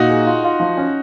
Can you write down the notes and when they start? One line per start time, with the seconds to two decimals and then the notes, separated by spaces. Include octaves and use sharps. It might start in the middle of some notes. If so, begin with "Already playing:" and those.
Already playing: A#2 D#4 F#4
0.09 G#4
0.26 F4
0.44 F4
0.60 F3
0.77 C#4